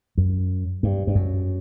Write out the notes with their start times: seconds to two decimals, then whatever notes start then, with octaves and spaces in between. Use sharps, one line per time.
0.18 F#2
0.83 G2
1.07 G2
1.15 F#2